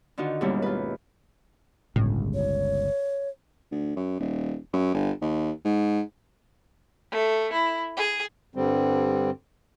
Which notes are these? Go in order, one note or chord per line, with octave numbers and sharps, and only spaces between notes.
D3 D#3 D#4 F4 F#4
D#2 G#2 B2 G3 C#4 E4
F4 B4
G1 C#2 A2
C#5
D2
F#2
D#1
F#2
G1
D#2
G#2
A3
E4
G#4
G2 D3 G3 C4